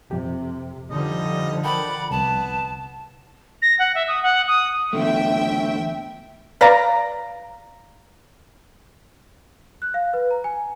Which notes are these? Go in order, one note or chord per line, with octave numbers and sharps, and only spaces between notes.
F2 C3 G4
D3 F3 G3 D#4 D#5
A#4 D5 F#5 G5 A5 B5
C2 B3 A5
A#6
F#5
E5
D#6
F#5
D#6
E2 D3 A3 E5 G5
B4 D5 F5 A#5
F#6
F5
B4
A#5
G#5